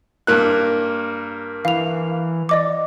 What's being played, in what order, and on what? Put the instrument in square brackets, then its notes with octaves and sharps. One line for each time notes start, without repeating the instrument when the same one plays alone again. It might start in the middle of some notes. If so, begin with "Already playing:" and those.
[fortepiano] G2 A#3 F#6
[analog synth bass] E3 [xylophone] F5 F7
[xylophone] D5 D#5 D6